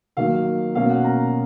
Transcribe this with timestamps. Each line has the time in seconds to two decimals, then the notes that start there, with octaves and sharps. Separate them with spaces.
0.17 D#3 F#3 A#3 F5
0.75 B2 A#3 C#4 F5
0.90 F#5
1.04 A#5